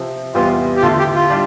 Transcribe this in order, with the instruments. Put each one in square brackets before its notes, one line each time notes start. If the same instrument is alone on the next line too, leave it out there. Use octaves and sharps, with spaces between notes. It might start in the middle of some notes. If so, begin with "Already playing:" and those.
Already playing: [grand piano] C3 F3 C4
[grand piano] E2 C3 G3 B3 [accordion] F4
[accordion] G4
[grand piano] D3 A3 E4 [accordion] F4
[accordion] G4
F4
[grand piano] G3 D4